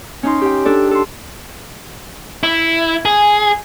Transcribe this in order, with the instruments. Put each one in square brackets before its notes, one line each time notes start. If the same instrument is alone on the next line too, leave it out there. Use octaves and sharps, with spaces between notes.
[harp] C#4 D#4 C6
G4 G5
D4 A4 D5
A4 C6
[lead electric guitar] E4
G#4